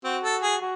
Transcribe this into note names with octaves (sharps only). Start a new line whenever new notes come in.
C4 F#4
A4
G#4
F#4